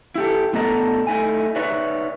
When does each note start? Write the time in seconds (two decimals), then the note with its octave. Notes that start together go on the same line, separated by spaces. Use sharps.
0.16 E4 G4 A4
0.53 A2 B3 D4 A4 D#5 A#5
1.07 A3 D#4 E4 G#5
1.56 D#4 B4 C#5 D5 E5